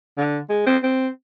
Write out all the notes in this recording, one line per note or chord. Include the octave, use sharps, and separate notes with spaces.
D3
G#3
C4
C4